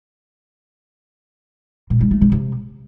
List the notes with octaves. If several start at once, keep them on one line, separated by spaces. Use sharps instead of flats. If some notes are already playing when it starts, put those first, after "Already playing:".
A#2
G3
A3
C3
C3